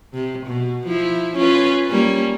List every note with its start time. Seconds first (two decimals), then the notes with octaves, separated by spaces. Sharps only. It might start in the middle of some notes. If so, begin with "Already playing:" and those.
0.14 C3
0.47 B2
0.87 F3 E4
1.37 C#4 F4 B4
1.88 G3 A#3 C#4